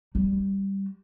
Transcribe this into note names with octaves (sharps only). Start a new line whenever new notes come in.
G3